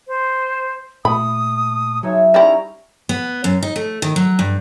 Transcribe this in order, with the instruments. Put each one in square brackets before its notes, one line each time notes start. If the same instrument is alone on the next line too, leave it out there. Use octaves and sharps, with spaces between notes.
[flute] C5
[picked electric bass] A#2 A3 [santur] A4 [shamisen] B5 [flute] D#6
[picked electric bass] F#3 [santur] G#3 D#4 E5 [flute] C#5
[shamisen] G3 E4 [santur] C#4 D#4 [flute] A#5
[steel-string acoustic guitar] B3
F#2
D#4
A3
D#3
F#3
G2